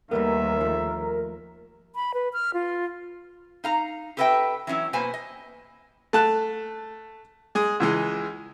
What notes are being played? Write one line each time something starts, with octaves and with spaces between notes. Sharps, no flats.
D#2 G3 A3 B3 A#4 E5
F3 A3
B5
B4
F6
F4
D#4 F5 A#5
G4 A4 B4 D#5 E5 G5
E3 F#3 C#4 E4
B2 A#3 B4 C5 G#5
D#5
A3 A5 F#6
G#3 G#4
C#2 E3 G#3